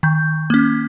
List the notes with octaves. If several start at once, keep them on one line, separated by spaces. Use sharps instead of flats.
D#3 G6
A#3 C#4